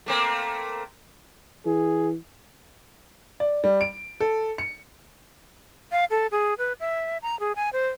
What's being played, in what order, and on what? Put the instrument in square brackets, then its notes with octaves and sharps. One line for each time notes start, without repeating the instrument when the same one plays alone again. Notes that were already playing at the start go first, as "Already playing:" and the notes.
[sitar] A3 A#3 C4
[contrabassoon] E3 [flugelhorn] G#4
[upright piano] D5
G3
D7
A4
C#7
[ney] F5
A4
G#4
B4
E5
A#5
G#4
G#5
C5